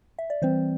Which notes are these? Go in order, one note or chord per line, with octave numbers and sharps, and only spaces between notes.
E5
D5
E3 G3 C4 C5